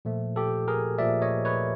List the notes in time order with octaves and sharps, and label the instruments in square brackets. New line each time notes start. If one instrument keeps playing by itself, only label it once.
[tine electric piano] A#2 F3 A3
G4 A4
G#4 A#4
A#2 F3 A3 D5 E5
C#5 D#5
B4 C#5